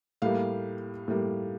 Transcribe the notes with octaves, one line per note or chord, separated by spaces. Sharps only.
A2 G3 A#3 F5
A2 G3 A#3